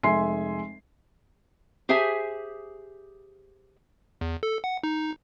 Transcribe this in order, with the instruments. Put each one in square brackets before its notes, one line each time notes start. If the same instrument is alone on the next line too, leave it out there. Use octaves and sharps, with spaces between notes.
[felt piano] F1 G#3 E5 G#5 C6 C7
[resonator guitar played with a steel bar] G4 G#4 C5 E5 G#5
[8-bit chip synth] E2
A4
F#5
D#4